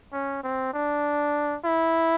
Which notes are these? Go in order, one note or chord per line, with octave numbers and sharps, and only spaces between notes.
C#4
C4
D4
E4